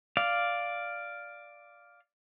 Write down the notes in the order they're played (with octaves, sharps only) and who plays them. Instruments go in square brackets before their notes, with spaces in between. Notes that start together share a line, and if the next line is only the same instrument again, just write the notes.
[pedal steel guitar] D5 F5